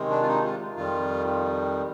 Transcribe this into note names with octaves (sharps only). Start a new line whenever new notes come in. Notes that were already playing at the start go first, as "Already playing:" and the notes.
Already playing: C3 D#3 G#3
D4
F4
D#4
F4
F2 D#3 G3 F4